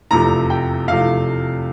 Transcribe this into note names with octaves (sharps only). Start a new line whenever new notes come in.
F1 E2 C3 F3 A3 A#5
G5
F1 E2 C3 F3 A3 F5